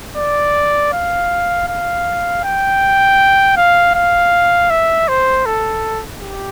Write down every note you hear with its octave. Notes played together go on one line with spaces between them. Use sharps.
D5
F5
F5
G5
F5
F5
E5
C5
A4
G4